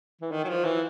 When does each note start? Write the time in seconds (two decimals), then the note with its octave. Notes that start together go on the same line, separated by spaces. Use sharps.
0.21 E3
0.31 D#3
0.44 F#3
0.49 F3
0.64 E3